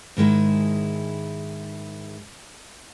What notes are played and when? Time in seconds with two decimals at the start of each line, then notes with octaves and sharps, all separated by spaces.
0.17 G#2 D#3 G#3 E4